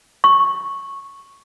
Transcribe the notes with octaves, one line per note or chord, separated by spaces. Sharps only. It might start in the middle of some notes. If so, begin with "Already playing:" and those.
C#6